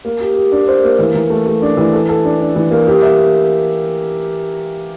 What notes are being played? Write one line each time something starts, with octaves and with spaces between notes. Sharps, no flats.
A#3
G4
G4
D4
C5
A#3
E3
E3
A3
A3
D4
E3
A4
A4
D4
D4
E3
A#3
G4
E5